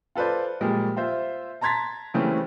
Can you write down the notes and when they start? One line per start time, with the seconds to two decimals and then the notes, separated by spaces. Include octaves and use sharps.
0.16 F4 A4 B4 C5 D5
0.61 A#2 F3 G3 G#3
0.97 F4 C5 E5
1.61 A5 A#5 C6 G#6 A6 B6
2.14 C#3 E3 G3 A3 C4 C#4